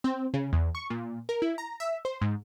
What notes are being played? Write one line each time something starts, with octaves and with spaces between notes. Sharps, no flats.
C4
C#3
E2
C#6
A#2
A#4
E4
A#5
E5
C5
G#2